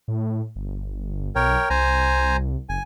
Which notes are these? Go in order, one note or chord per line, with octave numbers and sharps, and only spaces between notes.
A2
G1
B1 A#4 C#5 G5
C2 C5 G#5 A#5
F#1 G#5